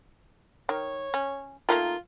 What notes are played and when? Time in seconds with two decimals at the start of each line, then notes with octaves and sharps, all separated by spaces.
0.69 D#3 C#5
1.14 C#4
1.69 D#3 A3 A#3 F4